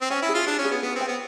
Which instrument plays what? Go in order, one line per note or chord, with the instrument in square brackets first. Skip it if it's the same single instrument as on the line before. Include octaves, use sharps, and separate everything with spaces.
[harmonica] C4
[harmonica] C#4 [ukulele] G5
[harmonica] E4
[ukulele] G#4
[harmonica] F4
[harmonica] D4 [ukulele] G#4
[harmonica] C#4
[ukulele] G#4
[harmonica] B3
[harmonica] B3 [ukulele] B4
[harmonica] C4
[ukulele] G5
[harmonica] B3